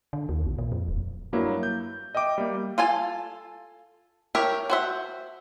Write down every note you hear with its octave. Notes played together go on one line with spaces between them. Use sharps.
D3
D#2
A#1
A#2
F2
D#1
G2 F#3 A#3 E4
G6
D#5 E5 G5 D6
G3 A#3
F4 A4 G#5
G4 A#4 C#5 E5
F#4 C5 E5